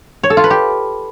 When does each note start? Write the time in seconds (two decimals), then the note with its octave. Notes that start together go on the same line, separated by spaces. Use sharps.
0.23 C#5
0.30 A4
0.37 F4
0.44 B4
0.50 G4